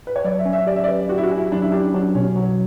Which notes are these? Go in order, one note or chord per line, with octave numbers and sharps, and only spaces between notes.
B4
C#5
F#3 D5
E5
C#4
E5
G4 D5
E5
D5
B4
F#4 G4
E4
F#4
C#4
E4
F#3 D4
E4
D4 G4
F#3 D4
B2 C#4
F#3